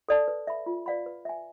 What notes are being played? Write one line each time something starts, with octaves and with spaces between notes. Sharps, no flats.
A4 D5 A5
B4
E5 B5
F4
B4 D5 F5 B5
B4
E5 G#5